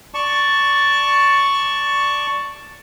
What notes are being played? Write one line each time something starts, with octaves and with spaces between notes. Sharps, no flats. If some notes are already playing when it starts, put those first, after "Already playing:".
D5 A5 C#6